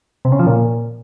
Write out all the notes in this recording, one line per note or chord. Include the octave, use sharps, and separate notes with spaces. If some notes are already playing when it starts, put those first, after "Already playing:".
C3
C#3
F3
A#2